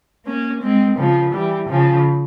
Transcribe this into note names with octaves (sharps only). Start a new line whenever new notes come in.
A#3 C#4
G#3 C4
C#3 F3
E3 G3
C#3 F3